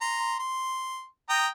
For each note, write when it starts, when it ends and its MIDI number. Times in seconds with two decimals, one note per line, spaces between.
0.01 0.36 82
0.01 0.36 84
0.39 1.05 84
1.29 1.47 79
1.29 1.47 82
1.29 1.47 87